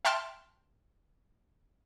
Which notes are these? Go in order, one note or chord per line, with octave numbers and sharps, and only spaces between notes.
E5 G5 A5 C6 F6